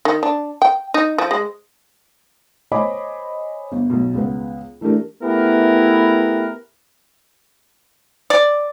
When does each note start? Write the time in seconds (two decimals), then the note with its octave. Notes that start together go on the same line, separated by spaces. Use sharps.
0.05 D#3
0.23 D4
0.62 G5
0.94 D#4
1.18 F3
1.31 G#3
2.71 C5 C#5 D#5 G#5 B5 D6
3.72 G1
3.90 B1 B2
4.14 C#2 B3
4.81 E3 A3 D4 G4 A#4
5.23 A3 B3 E4 G4 A#4 B4
8.30 D5